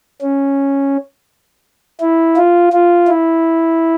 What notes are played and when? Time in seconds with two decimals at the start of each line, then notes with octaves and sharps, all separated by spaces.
0.22 C#4
2.01 E4
2.37 F4
2.73 F4
3.08 E4